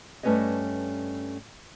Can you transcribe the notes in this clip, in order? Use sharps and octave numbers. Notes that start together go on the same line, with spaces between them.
G2 A3 C#4 B4 C#5 D#5